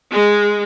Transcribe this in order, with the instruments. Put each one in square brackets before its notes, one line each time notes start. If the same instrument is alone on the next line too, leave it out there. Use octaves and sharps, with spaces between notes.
[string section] G#3